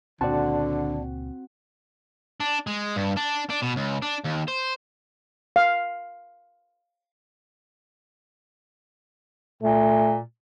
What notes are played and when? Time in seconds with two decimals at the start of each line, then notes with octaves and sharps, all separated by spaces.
0.21 C#2 A#2 D3 A#3 C4 F#4 D5 A5
2.40 D4
2.67 G#3
2.96 G2
3.17 D4
3.50 D4
3.63 B2
3.77 C#2
4.02 D4
4.24 D#2
4.48 C5
5.56 F5
9.63 A#2 A3